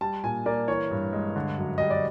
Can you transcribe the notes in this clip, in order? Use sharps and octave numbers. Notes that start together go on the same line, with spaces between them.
G3 A5
A#2 G#5
A#3 D5
E3 C#5
G2
G#3
D3
F#2
G3 D#5
D5